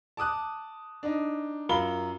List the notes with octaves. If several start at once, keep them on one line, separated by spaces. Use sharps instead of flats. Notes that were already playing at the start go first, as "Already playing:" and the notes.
A5 D6 D#6 F#6
D4 D#4
F#2 F4 A#4 B5 G7